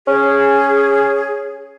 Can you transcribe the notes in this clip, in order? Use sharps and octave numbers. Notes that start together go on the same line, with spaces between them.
C#4 G#4